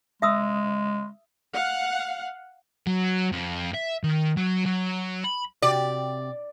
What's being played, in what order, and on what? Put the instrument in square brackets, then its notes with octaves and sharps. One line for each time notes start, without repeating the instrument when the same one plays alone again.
[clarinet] G#3 [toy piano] E5 D#6 E6
[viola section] F5 F#5
[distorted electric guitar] F#3
F2
E5
D#3
F#3
F#3
B5
[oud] C3 F#4 G4 [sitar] D5